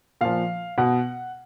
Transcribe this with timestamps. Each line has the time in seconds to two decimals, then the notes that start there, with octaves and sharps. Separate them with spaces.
0.21 A#2 F3 F5
0.78 B2 F#5